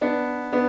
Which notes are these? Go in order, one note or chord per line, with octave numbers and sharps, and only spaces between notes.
B3 D4
B3 D4